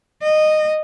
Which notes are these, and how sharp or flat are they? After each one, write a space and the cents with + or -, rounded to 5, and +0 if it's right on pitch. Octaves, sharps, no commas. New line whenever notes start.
D#5 -15